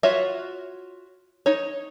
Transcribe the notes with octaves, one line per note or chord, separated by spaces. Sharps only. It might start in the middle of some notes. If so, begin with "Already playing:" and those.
F4 F#4 C#5 E5
D#4 C#5